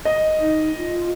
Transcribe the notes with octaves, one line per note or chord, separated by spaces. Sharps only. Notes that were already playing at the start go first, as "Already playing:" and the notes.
D#5
D#4
F4